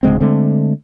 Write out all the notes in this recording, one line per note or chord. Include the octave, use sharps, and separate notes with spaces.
D1 C#3 G#3 C4
D3 G#3 A3 C4